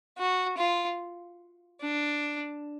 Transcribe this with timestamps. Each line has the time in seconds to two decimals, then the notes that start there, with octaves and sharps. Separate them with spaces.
0.18 F#4
0.58 F4
1.81 D4